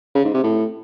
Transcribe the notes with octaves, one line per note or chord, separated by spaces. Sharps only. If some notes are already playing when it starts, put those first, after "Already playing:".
C#3
G#2
C3
A2